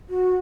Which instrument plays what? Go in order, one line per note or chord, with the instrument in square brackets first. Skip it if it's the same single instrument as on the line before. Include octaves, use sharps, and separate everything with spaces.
[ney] F#4